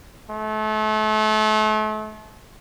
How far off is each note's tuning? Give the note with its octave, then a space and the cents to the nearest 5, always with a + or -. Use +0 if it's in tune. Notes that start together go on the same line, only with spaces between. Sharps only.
A3 -35